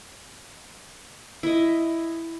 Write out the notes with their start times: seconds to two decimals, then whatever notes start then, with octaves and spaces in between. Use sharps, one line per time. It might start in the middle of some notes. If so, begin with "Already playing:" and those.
1.43 E4 D#5